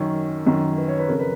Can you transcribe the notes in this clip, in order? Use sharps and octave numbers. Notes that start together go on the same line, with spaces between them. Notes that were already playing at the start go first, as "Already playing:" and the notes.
Already playing: F#2 D#3 C#4
F#2 D#3
B4
C#5
B4
F2 C#3 A#4
B4